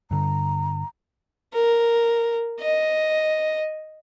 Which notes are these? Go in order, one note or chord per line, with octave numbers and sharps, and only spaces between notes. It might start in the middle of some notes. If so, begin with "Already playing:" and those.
G2 D3 A#5
A#4
D#5